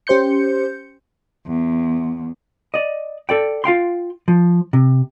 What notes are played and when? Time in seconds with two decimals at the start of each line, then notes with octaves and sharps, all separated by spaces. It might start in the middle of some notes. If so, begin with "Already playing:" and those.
0.07 C#4 G4 C5 C6 G6 C#7
1.45 E2
2.74 D5 D#5
3.29 A4 D5 G5
3.64 F4 F5 G5 C6
4.28 F3
4.73 C3